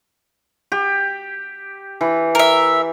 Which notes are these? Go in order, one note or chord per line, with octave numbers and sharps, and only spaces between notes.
G4
E3
A#4 E5